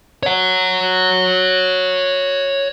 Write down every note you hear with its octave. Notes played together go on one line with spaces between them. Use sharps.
C#5 F#5